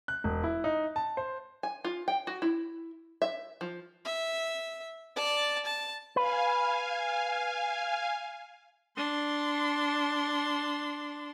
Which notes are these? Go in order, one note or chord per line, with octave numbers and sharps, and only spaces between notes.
F#6
E1
E4
D#4
A5
C5
G#5
F4
G5
F#4
E4
E5
F3
E5
D5 A5
A5
B4 F5 G#5
D4 C6